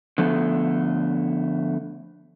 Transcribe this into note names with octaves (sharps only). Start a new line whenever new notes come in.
D3 F3 A3 B3